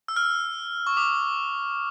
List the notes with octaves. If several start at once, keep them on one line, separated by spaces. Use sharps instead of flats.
E6
F6
E6
C#6
D6